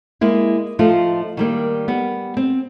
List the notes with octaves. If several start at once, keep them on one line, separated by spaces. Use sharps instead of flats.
G#3 A#3 E4
F3 A3 D#4 F4
D#3 G3 A#3
G3 B3
C4